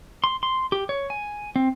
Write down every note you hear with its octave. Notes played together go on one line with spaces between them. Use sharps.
C6
C6
G4
C#5
G#5
C4